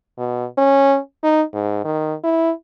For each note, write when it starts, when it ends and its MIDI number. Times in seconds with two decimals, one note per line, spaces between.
0.18 0.45 47
0.58 0.98 61
1.23 1.42 63
1.54 1.84 44
1.85 2.14 51
2.24 2.51 64